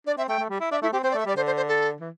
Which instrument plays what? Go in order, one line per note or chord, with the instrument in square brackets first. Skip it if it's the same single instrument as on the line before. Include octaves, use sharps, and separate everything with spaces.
[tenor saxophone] D4 [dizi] D5
[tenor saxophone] C4 [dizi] E5
[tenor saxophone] A3 [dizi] G5
[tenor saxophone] A3
G3
E4
[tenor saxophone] D4 [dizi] E5
[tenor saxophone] A3 [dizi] E4
[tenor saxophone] C4 [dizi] G4
[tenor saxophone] C4 [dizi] C5
[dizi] D5
[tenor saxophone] A3
[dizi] E5
[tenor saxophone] G3 [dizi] D5
[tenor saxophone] D3 [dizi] C5
[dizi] C5
C5
A4
[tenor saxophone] E3